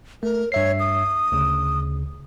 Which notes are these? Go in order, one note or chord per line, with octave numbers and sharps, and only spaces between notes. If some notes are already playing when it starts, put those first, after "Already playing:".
A3 A#4
G2 C#5 E5 C7
D#6
D2 C#3